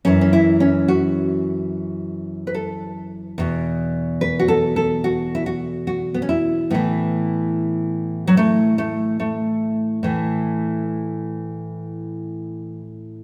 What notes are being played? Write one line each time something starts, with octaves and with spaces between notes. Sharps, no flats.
F#2 E3 C#4
C#4
E4
C#4
F#4
B4
A4
E2 B2
B4
F#4
A4
A4
F#4
E4
F#4
F#4
B3
C#4
E4
A2 E3 B3
F#3
A3
A3
A3
A2 E3